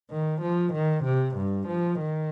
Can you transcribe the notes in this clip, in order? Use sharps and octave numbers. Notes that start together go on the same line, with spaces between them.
D#3
F3
D#3
C3
G2
F3
D#3